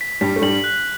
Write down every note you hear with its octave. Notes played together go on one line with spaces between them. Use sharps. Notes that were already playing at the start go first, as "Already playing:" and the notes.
B6
G2 G3 B6
A3
G2 G3 F#7
F#6